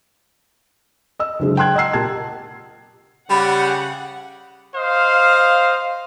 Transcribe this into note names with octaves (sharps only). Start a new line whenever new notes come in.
D#5 E6
F#1 D3 G#3
G5 A5 C6 F#6 G#6
D#5 F#5 A#5 E6 C7
A#2 G4 A5 G#6
C#3 G3 G4 F#5 B5
C5 D#5 F5